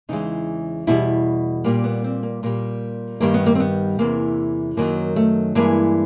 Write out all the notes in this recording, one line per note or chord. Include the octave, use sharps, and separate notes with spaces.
E2 C#3 E3 G#3 D#4
E2 B2 G3 E4
A#2 G3 A#3
B3
C4
A#3
A#2 G3 A#3
G2 D#3 G3 A#3
B3
A#3
C4
B3
E2 C3 E3 A#3
F#2 D#3 F#3 A#3
A3
G2 E3 G#3 A#3